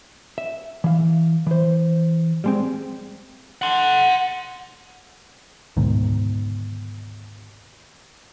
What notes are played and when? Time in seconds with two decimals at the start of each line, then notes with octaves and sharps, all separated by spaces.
0.38 E5
0.84 E3 F5
1.47 E3 C5
2.44 G3 G#3 C4
3.62 F#5 C6
5.77 D2 G#2 B2 D#3